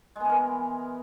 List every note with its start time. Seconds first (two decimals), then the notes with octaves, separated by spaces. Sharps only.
0.16 G#3
0.20 B3
0.25 E3
0.29 A#4